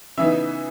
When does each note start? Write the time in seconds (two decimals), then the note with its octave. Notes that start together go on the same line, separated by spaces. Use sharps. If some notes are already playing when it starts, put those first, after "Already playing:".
0.18 C#3 E3 B3 D#4 E5